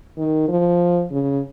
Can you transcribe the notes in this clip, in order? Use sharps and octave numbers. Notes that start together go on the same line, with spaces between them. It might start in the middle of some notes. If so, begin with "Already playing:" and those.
D#3
F3
C#3